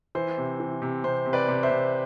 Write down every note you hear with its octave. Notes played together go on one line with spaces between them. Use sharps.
E3 C5
C3
E3
C3
C3 C5
C3
B4 D5
C3
C5 E5
C3